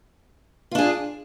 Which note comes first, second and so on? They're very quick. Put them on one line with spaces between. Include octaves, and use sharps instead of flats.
F4 D4 G#4